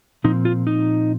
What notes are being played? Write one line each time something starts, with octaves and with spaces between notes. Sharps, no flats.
A#2 F3 C4 D#4
F4
D#4